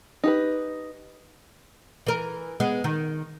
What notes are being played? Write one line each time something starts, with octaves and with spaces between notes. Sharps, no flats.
D#4 G4 B4
E3 A#4
G#3 B3
D#3